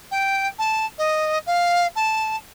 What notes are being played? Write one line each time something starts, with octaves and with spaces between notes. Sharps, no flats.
G5
A5
D#5
F5
A5